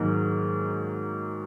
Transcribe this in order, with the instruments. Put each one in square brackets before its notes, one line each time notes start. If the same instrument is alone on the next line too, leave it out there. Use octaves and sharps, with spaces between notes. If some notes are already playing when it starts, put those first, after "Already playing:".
Already playing: [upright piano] G#2 D#3 F#3 A#3